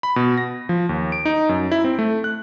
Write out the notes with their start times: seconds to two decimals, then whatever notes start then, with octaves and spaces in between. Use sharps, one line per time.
0.03 B5
0.16 B2
0.38 A#6
0.69 F3
0.89 D#2
1.12 D7
1.25 D#4
1.49 F#2
1.72 E4
1.84 C4
1.99 A3
2.24 F#6